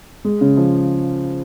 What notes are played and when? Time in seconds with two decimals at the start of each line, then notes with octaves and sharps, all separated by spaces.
0.25 G#3
0.41 C#3
0.57 F3